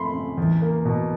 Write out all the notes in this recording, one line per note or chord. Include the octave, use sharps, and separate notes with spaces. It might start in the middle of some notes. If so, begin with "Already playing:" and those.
Already playing: F2 A3 B5 C6
C#3
E2
A#3
B2